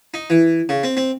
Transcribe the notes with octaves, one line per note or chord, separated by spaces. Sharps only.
D#4
E3
C#3
C4
C4